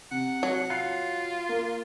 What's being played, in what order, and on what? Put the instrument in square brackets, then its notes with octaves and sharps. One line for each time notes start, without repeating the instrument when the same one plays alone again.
[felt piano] C3 [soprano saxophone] F#5
[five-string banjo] F#3
[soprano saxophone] F4 [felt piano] F#6 C7 C#7
[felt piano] A#3